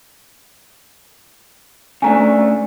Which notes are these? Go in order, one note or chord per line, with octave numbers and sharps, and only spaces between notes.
C#3 A3 D4 G#5 A#5